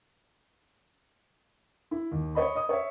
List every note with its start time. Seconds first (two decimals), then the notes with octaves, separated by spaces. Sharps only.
1.91 E4
2.11 D#2
2.35 C#5 D#5 B5
2.55 D#5 D#6
2.69 C#5 E5